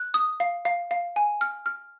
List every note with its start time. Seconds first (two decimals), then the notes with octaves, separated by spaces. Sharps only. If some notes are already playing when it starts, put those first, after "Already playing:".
Already playing: F#6
0.14 D#6
0.40 F5
0.65 F5
0.91 F5
1.16 G#5
1.41 F6
1.66 F6